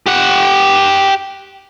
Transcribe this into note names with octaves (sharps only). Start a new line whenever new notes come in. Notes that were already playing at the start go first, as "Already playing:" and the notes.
G4 F#5